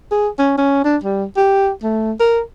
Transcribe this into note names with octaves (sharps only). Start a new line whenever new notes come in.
G#4
C#4
C#4
D4
G3
G4
A3
A#4